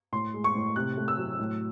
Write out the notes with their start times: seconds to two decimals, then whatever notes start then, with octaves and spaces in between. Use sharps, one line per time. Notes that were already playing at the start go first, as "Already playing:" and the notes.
0.12 A2 C6
0.34 G#3
0.44 C#6
0.55 A2
0.76 C3 F#6
0.97 A3
1.08 E6
1.18 F#3
1.39 A2